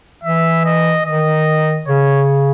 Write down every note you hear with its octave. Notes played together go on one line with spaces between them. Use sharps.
E3 E5
D#5
D#3 D#5
C#3 C#5